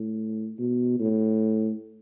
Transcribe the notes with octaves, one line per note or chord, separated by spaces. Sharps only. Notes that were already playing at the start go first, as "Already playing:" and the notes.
Already playing: A2
B2
A2